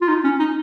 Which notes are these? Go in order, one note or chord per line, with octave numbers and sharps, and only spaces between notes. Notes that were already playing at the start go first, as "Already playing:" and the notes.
F4
D#4
C#4
D#4